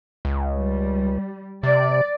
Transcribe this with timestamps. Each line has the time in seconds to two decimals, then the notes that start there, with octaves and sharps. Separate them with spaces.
0.25 C#2
0.56 G3
1.63 C3 D5